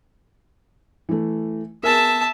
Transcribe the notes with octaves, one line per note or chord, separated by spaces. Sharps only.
E3 A3
B3 G#4 A#4 E5 A5